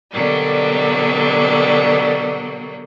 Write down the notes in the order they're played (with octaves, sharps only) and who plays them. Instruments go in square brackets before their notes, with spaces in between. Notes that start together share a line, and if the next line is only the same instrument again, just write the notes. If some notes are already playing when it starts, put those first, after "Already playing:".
[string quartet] B2 D3 F#3 G3 A#3